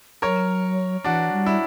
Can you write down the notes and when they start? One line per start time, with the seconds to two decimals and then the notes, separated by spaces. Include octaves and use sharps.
0.22 F#3 A#4 C#5
1.04 E3 D4 F#4
1.32 G3
1.46 E4